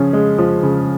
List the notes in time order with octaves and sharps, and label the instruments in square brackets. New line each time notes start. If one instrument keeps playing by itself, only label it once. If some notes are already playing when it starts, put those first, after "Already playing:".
Already playing: [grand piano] C#3 F3 C#4
G#3
F3
C#3